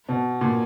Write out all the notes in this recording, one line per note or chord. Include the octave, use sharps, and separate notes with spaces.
B2
A#2